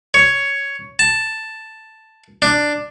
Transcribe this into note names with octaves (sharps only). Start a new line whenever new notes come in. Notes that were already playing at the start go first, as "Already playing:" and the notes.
C#5
A5
D4